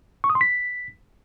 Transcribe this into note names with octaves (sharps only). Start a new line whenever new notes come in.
C#6
D#6
C6
B6